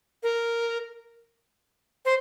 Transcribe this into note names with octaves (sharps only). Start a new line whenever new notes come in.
A#4
C5